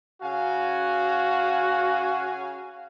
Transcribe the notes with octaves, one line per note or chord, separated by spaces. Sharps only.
C#3 F#4 F5 G#5